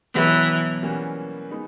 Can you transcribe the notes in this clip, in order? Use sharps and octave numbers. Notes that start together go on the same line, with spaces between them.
B2 E3 F#3 B3 E4 G4
E3 G3 A#3 C#4 F#4
G#3 B3 D#4